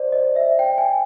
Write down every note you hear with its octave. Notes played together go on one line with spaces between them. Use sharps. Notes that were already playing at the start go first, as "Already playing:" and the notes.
Already playing: C5 D5
D#5
E5
G5
G#5